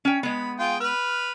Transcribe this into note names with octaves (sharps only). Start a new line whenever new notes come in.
C#4 G5
G#3 B3 B5
F4 G#4 G5
B4 F6